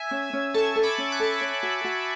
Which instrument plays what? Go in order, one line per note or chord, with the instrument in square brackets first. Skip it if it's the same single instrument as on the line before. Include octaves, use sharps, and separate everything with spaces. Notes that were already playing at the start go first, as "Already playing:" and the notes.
Already playing: [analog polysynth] E5 G#5
[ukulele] C#4
C#4
[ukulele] A4 [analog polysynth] A5 C#6
[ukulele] A4
[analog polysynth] B5 D6
[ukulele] C#4
[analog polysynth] D6 F#6
[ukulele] A4
C#5
F#4
F#4